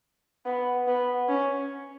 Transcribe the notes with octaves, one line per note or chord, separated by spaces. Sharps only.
B3
B3
C#4